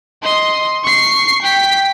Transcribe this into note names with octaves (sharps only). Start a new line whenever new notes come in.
D#5 C6
C#6 C7
G5 B6